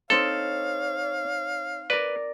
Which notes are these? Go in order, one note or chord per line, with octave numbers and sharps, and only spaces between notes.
C4 D#4 A4 C#5 F5
A#4 B4 D5